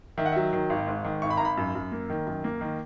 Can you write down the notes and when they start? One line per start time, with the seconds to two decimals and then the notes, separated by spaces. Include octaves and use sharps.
0.18 D#3 E5
0.26 F#5
0.32 F#3 E5
0.53 D#3
0.70 G#1
0.87 G#2
1.04 D#3
1.22 G#1 C#6
1.30 B5
1.37 G#1 A#5
1.45 B5
1.57 F#2
1.75 F#2
1.92 A#3
2.10 D#3
2.26 F#2
2.44 A#3
2.61 D#3